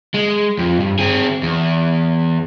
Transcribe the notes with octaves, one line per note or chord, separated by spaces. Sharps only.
G#3
F2
G2
C4 G#4
E2